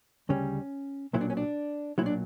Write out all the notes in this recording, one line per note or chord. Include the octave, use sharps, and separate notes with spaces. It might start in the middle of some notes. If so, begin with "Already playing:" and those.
D2 C#3 G3 C#4
B1 A#2 F#3 E4
D4
C#4
D4
B1 A#2 F#3 E4
D4